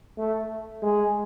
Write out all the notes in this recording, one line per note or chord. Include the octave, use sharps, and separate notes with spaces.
A3
G#3